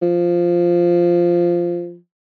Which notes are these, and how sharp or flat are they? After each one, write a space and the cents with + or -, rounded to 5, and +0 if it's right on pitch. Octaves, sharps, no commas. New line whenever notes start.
F3 -5